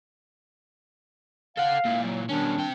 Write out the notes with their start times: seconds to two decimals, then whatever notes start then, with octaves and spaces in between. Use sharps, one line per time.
1.57 A4 F5 F#5
1.85 A#2 E4
2.03 F#3
2.29 B2 D#3 G3 C#4 D4
2.58 C3 G5